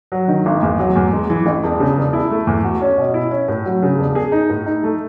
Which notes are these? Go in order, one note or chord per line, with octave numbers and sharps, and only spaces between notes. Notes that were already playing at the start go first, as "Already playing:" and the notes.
F#3
D#3
G#1
E2
F#3
E2
G#3
E3
A1
E1
C#3
E1
E4
A3
E2
F#4
C#4
B2
E4
C#4
A2
F#3
C#3
E1
G#4
D#4
A2
D#4
A3